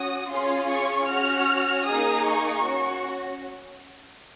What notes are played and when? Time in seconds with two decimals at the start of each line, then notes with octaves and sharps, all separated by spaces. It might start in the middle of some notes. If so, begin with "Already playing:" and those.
Already playing: C#4 F#4 D#6
0.30 C#4 F4 G#4 C6
0.69 C#6
1.08 C#4 F#4 F6
1.86 A#3 D#4 G#4 D#6
2.24 C#6
2.64 C#4 F#4